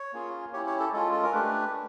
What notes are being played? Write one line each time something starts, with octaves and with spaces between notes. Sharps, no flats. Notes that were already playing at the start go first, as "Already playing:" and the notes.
Already playing: C#5
A#3 C#4 F4 G#4
C#4 E4 G4 C#5
C#5
A4
G#3 C#4 F4 A4
A4
A#4
A3 D4 G4 B4
C#4